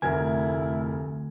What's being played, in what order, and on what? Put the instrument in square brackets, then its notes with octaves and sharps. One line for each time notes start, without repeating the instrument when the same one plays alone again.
[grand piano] F1 A#4 G#6 [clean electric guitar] D2 [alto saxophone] E4 [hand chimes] G#5